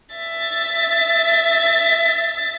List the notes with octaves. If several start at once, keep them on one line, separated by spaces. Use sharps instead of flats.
E5 A6